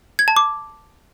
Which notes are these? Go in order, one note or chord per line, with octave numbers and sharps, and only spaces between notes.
G#6
A5
D6